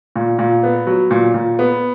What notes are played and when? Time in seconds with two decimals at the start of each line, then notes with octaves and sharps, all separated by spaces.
0.16 A#2
0.39 A#2
0.63 B3
0.87 F#3
1.11 A#2
1.34 A#2
1.59 B3